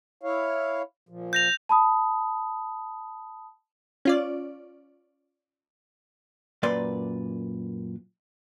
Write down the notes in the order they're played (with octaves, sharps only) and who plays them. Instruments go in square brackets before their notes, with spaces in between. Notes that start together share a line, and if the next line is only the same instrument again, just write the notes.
[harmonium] E4 C#5 F5
A#2 F3
[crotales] G6 A#6 F7
[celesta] A5 B5 D#6
[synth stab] C#4 F4 D5
[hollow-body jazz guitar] F#2 A#2 B4 D5 C6